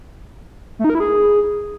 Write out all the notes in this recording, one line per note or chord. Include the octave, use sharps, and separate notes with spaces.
A3
D#4
A#4
E4
G#4